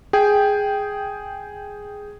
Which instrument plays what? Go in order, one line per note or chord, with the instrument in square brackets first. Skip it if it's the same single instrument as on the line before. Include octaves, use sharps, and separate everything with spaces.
[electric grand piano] G#4 G5